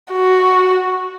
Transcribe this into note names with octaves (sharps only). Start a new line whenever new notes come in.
F#4